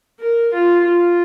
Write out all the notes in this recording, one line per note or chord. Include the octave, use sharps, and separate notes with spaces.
A#4
F4
F4